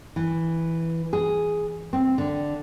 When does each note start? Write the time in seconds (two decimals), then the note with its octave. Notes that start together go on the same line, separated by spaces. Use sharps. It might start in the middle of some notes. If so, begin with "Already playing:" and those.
0.16 E3
1.13 G#4
1.93 C4
2.18 D3